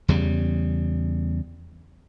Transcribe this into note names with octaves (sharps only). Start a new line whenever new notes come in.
E2 C#3 G3